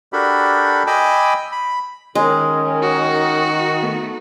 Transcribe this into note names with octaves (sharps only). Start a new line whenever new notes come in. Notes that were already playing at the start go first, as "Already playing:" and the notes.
D4 F#4 G4 A4 A#4 B5
D#5 G5 G#5 B5 D6 E6
B5
D#3 G#3 C#4 A#4
D#4 F#4
A3 B3